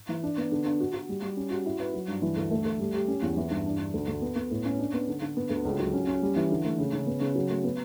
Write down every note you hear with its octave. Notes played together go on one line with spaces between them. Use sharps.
E3
D4
B3
D3
D4
F#4
F#4
G3
G3
C#4
F#4
E4
B4
F#3
G2
E3
D2
A3
A3
G3
G4
C#4
E2
E3
G2
D4
D4
D2
D2
B3
B3
A2
C#4
D4
B3
D3
D3
B3
D2
C#2
F#3
C#4
C#4
G3
E3
D3
A3
C#3
C#3
B3
C#3
F#3
A3
B3